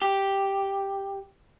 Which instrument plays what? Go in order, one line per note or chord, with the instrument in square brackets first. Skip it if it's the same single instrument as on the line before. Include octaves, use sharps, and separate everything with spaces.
[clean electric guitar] G4